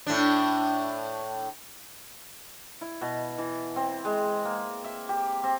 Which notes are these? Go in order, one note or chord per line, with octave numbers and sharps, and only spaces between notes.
A2 D4
E4
B2
E3
C4
G#3
A#3
E5
G4
C4